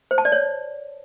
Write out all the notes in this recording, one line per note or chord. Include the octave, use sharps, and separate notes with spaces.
C5
A5
D5
C#5